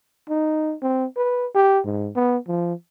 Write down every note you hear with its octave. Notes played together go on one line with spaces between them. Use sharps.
D#4
C4
B4
G4
G#2
B3
F3